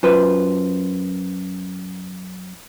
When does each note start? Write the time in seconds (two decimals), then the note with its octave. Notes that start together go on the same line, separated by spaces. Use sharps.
0.03 F#2 F4 B4 C5